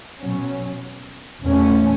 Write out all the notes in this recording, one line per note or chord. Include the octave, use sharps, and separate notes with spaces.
B2 F#3 C#4
E2 B2 A3 C#4